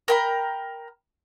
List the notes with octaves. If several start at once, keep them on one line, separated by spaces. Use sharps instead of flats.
A#4 G5 B5